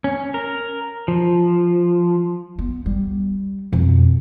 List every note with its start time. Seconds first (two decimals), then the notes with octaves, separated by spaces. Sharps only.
0.04 C#4
0.34 A#4
1.08 F3
2.59 B3
2.86 G3
3.72 F2 B2